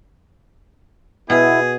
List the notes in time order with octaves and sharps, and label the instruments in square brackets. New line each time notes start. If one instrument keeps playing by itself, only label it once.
[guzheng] B2 [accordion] B3 E4 [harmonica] G#4